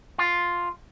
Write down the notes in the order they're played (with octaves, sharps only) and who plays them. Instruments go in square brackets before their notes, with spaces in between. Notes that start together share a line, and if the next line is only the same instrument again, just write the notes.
[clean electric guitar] F4